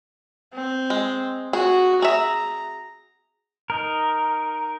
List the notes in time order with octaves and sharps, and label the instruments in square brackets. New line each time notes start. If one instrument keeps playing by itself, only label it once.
[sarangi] C4
[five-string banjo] G#3
[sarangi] F#4 [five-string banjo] G#4
[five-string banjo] G#4 E5 [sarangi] A#5
[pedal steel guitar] D#4 A#4